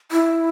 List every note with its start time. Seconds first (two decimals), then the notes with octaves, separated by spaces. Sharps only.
0.12 E4